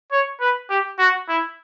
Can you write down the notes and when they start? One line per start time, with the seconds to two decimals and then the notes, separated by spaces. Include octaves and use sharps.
0.11 C#5
0.40 B4
0.70 G4
0.98 F#4
1.29 E4